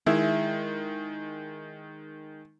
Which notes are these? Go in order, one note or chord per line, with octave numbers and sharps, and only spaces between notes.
D#3 G#3 E4 E5